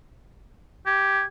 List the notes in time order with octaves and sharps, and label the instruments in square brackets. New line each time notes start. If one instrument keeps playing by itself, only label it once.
[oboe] G4 [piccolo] G#6